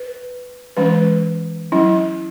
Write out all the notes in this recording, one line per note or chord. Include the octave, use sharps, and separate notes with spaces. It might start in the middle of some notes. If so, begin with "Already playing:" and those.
Already playing: B4
E3 G#3 C#4 B4
F#3 C#4 E4